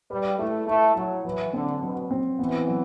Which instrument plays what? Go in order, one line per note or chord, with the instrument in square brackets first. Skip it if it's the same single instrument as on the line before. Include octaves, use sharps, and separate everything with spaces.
[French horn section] G3 [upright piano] B4
[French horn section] A3 [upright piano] E4
[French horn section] A3 [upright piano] E4
[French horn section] F#3 [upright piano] E4
[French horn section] E3 [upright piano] F#3
[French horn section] D3 [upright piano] C4
[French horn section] B2 [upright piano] F#3
[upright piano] C4
[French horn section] E3 [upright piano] B3
[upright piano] F#3